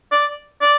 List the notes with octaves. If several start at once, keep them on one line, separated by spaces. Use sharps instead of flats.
D5
D5